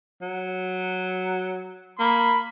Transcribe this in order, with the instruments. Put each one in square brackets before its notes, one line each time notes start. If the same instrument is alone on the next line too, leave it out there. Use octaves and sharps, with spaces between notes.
[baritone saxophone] F#3
[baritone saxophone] A#3 [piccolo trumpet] B5